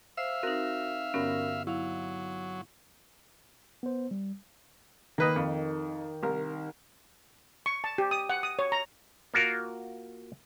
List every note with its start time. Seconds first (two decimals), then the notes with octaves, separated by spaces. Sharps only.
0.17 C5 E5 F5 E6 C7
0.43 C4 D#4 F#4 A#4
1.14 G2 D3 B3 C#4 F#4 A#4
1.67 F#3 E4 F5
3.83 B3 C5
4.11 G3
5.18 D#3 A#3 B4 D#5
5.36 F2
6.23 C2 A#4
7.66 C#6
7.84 A5
7.98 G4
8.11 D#6
8.29 F#5
8.43 D#6
8.59 C#5
8.72 A#5
9.34 A#3 F4 F#4 A#4 F5